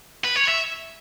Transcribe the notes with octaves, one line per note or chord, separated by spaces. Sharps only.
B4
C#5
E5